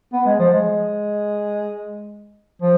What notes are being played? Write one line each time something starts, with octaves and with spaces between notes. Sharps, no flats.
B3
G#3
F3
G#3
F3